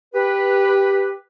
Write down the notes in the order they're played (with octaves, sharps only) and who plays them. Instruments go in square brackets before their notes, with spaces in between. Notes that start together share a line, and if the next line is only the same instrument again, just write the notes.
[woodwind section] G4 B4